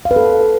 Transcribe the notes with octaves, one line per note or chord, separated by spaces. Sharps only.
F5
B4
A4